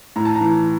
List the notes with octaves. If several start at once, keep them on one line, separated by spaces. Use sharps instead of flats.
A2 A#5
A5
A#5
E3